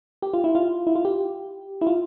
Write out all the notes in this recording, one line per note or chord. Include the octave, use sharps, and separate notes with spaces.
G4
F4
E4
F4
E4
F4
G4
E4
F4